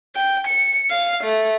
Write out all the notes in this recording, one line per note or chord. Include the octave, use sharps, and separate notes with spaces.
G5
C#7
F5
A3